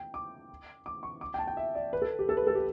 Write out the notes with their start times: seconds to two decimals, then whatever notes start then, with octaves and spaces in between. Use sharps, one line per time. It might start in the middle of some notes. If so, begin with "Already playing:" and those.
Already playing: G5
0.14 D6
0.86 D6
1.03 C#6
1.21 D6
1.34 G5
1.39 A5
1.47 G5
1.57 E5
1.75 D5
1.93 B4
2.02 A4
2.19 G4
2.29 A4
2.37 B4
2.47 A4
2.55 G4